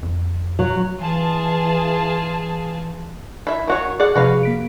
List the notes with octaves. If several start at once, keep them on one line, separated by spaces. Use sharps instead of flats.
F2
F#3
E3 F4 G#4 A5
E4 E5
D#3 F#4 C#5
G#4 D5 F#5
C3 F3 F#4 G#4 B4 F5
A#3 B6 D7